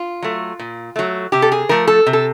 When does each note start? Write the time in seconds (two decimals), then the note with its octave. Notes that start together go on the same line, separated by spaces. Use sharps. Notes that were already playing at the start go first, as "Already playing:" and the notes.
Already playing: F4
0.23 F#3 A3
0.59 A#2
0.96 F#3 A3
1.32 C3 G4
1.42 A4
1.52 G#4
1.69 F3 A3 A#4
1.87 A4
2.07 C3
2.13 A4